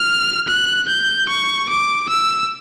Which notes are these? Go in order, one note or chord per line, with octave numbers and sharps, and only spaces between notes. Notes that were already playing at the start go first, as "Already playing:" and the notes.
Already playing: F6
F#6
G6
C#6
D6
E6